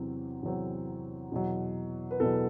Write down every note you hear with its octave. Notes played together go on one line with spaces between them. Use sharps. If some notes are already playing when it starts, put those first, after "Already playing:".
Already playing: E2 C3 F#3 C4
E2 C3 F#3 C4
E2 B2 F#3
B4
E2 B2 F#3 A4